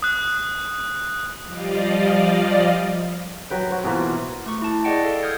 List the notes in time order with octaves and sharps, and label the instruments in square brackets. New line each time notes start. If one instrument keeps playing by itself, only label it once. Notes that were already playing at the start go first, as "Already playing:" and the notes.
[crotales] D#6 F#6
[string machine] F3 G3 D5 D#5 F5
[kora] F#3 B4 G5
C4 F#4
B2 E3 A#3 F4
[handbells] A3 C#6
E4 A5
G#4 D5 D#5 F#5 G5
A4 F5
D#6 F6 G6 G#6